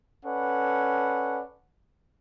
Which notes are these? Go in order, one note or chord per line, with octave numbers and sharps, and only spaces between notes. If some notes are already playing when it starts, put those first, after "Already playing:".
C#4 A4 B4 D5 F#5